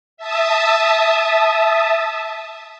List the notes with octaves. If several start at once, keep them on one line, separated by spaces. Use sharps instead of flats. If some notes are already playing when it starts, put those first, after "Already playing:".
E5 A5 D#6